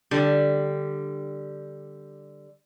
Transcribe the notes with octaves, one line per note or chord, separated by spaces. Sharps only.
D3 G3 G4